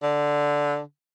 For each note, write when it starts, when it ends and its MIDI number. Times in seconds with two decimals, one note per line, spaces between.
0.03 0.80 50